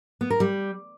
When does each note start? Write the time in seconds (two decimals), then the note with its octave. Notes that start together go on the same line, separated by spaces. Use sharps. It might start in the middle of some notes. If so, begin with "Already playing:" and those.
0.21 B3
0.30 A#4
0.40 G3